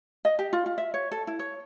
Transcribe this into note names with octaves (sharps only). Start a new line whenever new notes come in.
D#5
G4
F4
F4
E5
C#5
A4
E4
C#5